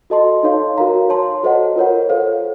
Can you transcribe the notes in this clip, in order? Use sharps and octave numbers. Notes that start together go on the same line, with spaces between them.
F#4 A4 D#5 A5 C6
D#4 A4 C#5 F5 C6
F#4 A#4 F5 A#5
C#5 A5 C6
F#4 A4 C5 D#5 F#5
F4 A#4 C#5 F#5
A4 C5 F5